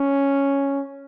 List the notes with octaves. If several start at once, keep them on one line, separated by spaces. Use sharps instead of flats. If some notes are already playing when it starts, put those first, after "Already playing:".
Already playing: C#4